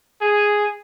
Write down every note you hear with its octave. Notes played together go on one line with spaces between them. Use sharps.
G#4